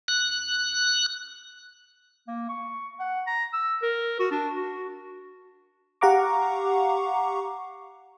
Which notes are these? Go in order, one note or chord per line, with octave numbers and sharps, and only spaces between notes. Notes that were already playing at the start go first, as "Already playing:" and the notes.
F#6
A#3
C#6
F#5
A#5
E6
A#4
F#4
D4
F#4
G4 F5 F#5 A#5 C#6 D6